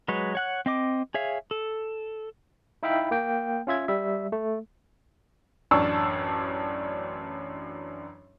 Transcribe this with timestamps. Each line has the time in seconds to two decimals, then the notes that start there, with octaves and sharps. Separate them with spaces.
0.08 F#3 G#3 B4 C#5
0.35 C#5 F#5 F#6
0.66 C4 D#5 D6
1.14 G#4 C#5 E5 F5
1.51 A4
2.83 D#4 E4 E5 F5 G5 B5
3.11 A#3 G5
3.67 C#4 F4 E5 G#6
3.88 G3 E5
4.32 A3
5.71 A1 F#2 D4 A5 C#6 E6